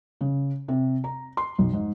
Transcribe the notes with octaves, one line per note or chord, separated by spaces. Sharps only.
C#3
C3
A#5
C6
B1
G#2